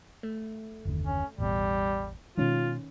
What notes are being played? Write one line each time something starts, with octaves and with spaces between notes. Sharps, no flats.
A3
F#1 D#2 D3
C#4
E1 A1 B2 G3
B2 D#3 G#3 C#4 F4